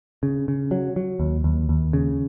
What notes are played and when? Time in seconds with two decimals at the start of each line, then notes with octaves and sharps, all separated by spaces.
0.23 C#3
0.48 C#3
0.71 F#3
0.96 F#3
1.20 D#2
1.44 D#2
1.69 D#2
1.93 C#3